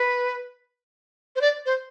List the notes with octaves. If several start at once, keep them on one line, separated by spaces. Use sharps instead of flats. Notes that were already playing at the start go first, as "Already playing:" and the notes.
Already playing: B4
C5
D5
C5